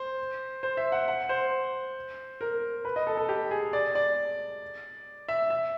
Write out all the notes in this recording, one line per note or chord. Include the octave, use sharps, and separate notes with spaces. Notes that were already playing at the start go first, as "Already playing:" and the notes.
Already playing: C5
C5
E5
F#5
F#5
C5
A#4
B4
D#5
A4
A4
G4
G#4
D5
D5
E5
E5